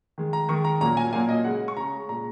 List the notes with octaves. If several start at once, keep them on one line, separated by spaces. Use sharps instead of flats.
D#3 G#3
A#5
D#3 G#3 C#6
A#5
A#2 F#3 A#3 A#5
G#5
A#2 F#3 A#3 G#5
D#5
C#3 G#3 F#5
C#6
C#3 G#3 A#5
A#2 G#3 A#5